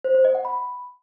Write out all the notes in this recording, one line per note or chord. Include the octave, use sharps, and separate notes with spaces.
C5
C5
D#5
F#5
B5